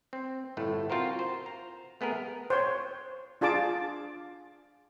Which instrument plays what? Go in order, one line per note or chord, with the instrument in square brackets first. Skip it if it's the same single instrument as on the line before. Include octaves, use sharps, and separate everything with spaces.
[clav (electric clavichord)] C4
G1 A2 A3
C4 F4 F#4 A#4 C5
C5
A#5
A3 B3 G#4 A#4
[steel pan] C5 C#5
D4 F4 G#4 A5 D6